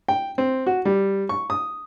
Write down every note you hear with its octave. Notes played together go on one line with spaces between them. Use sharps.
G5
C4
F#4
G3
C#6
D#6